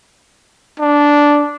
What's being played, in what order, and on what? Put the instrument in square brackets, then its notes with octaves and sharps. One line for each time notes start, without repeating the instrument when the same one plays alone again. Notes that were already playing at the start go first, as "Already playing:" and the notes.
[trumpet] D4